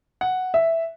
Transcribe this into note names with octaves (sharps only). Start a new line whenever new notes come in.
F#5
E5